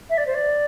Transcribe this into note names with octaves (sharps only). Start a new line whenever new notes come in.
E5
D5
C5
D5